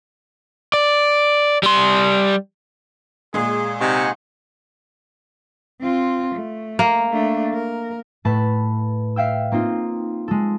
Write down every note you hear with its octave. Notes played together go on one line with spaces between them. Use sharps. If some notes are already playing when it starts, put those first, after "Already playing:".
D5
G3 C6
A#2 G#3 G#4
C3 D#4 F#5 G#5 C#6
C4 F4
A3
A#3
A3 D4
A#4
A2 A3 B4 A5 B5
E5 F5 G5 E6
A#3 C4 D#4 F4
G#3 A4